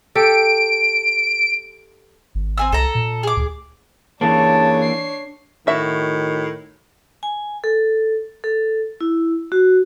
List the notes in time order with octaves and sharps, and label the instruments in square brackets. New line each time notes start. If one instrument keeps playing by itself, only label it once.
[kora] G4 A4 [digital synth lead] D7
[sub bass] G#1
[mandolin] C4 G#5 E6
[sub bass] C2 [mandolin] A4 A#5
[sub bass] A#2
[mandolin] G#4 D6
[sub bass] D2
[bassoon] C#3 [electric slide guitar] E3 A#3 [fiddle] D4 C#5 [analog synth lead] A5
[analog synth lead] C7
[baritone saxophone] A2 [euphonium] D#3 [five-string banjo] F#4 E5
[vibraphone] G#5
A4
A4
E4
F#4